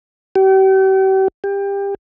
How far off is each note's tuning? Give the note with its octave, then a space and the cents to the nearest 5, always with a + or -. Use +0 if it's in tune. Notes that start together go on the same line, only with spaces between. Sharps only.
G4 -40
G4 +25